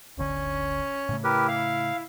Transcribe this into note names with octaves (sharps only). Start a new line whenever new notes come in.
D1 G1 D3 C#4
A2 C#3 A3
E4 G4 A#4 B4
F5